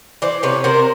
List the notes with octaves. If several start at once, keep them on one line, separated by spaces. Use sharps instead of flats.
E3 C5 D5
C3 B4 C#5
C3 A#4 C5